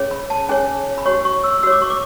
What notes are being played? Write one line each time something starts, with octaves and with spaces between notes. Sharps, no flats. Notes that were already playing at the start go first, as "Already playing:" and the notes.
Already playing: C#4 G#4 C#5
B5
A5
C#4 G#4 C#5 G#5
B5
F#4 C#5 C#6
C#6
E6
F#4 C#5 E6
D6
C#6
D6